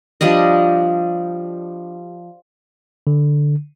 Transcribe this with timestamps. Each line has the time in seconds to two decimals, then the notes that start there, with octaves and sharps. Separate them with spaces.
0.21 F3 G3 D4 D#5
3.07 D3